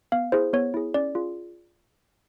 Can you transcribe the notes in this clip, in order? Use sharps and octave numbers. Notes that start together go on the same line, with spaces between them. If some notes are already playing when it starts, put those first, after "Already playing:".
B3 F5
E4 G#4 C5
B3 C#5
E4 G#4
C#4 D5
F4 G#4